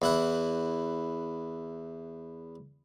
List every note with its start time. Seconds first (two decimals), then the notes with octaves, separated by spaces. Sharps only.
0.02 E2 E4 F#5